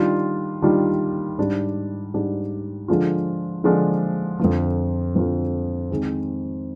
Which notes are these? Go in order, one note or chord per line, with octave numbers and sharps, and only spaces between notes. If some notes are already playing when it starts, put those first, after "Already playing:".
Already playing: D#3 G3 D4 F4
D#3 G3 D4 F4
G#2 G3 D4
G#2 G3 D4
D3 F3 G#3 D4 F4
D3 F3 G#3 D4 F4
F2 D3 F3
F2 D3 F3
D#3 G#3 C4